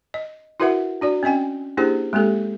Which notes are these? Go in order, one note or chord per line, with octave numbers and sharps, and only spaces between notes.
D#5
E4 F#4 A#4 B4 E5 F#5
D4 F#4 D5
C4 C#4 D#5 G5 G#5
A#3 D4 E4 G4 G#4 C5
G#3 A#3 C4 G4 A4